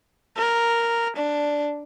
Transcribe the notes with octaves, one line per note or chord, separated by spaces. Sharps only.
A#4
D4